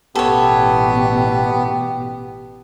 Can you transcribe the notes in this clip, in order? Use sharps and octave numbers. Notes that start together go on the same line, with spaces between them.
A1 B2 B3 G4 A4 C#5